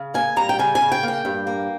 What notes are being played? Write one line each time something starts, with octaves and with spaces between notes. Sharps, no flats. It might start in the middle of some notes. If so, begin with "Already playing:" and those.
Already playing: C#3
A#3 G#5
G3 A#5
G5
C#3 G#5
G#5
C#3
G5
A#3
G5
G2
A#3